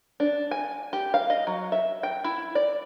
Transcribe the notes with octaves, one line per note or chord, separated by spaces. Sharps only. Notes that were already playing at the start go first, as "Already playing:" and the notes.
D4
G#5
G4
F5
D#5
F#3
E5
G5
E4
D5